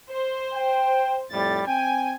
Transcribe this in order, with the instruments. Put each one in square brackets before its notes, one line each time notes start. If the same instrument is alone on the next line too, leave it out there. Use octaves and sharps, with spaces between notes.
[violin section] C5
[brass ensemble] G5
[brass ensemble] F2 A2 G3 [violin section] A6
[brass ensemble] C4 G5 [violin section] G#5